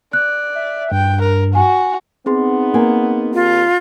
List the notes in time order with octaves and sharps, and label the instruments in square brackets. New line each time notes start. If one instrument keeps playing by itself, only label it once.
[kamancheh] D5 [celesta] F#6
[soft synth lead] E5
[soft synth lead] G2 [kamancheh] G5
[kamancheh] A#4
[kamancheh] F#4 [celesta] G#5
[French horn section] B3 D#4 [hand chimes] C4 G#4 C6
[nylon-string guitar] A#3 G#5
[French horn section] D#2 [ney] F4